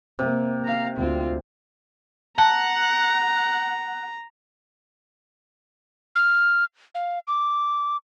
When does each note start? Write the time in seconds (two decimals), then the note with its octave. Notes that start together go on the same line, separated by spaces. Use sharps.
0.19 C3 A#3
0.65 F5 A#5
0.97 D2 C4 F4
2.38 F#5 A5 A#5
6.16 F6
6.95 F5
7.28 D6